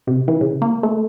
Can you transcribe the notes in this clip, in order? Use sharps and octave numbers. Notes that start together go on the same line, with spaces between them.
C3
E3
C#3
A#3
A3